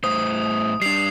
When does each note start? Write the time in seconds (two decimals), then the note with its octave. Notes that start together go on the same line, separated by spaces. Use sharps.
0.04 A2 C5 D#6
0.82 G3 D4 C7 F7